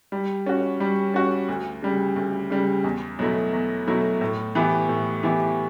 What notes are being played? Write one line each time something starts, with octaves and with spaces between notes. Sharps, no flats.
G3
C#4 F#4
G3
C#4 F#4
D2
C#3 G3
D2
C#3 G3
E2
B2 F#3 A3 E4
E2
B2 F#3 A3 E4
A2
E3 B3 E4 G4
A2
E3 B3 E4 G4